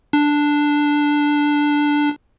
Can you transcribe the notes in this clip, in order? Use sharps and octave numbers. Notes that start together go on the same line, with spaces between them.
D4